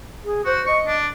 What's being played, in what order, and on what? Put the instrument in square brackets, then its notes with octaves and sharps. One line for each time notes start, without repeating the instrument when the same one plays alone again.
[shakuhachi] G#4
[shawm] F#4 [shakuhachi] C5
[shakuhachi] D#5 [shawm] C#6
[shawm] D4